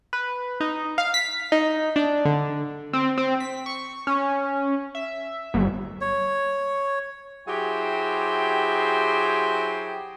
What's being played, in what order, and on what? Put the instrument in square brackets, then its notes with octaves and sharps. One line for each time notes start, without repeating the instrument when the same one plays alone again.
[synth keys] B4
D#4
F5
B6
D#4
D4
D3
[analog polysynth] C4
C4
B6
C#6
C#4
E5
G1
[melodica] C#5
[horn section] F#3 E4 G4 G#4 C5 G5